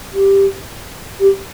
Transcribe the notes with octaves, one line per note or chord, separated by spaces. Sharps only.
G4
G4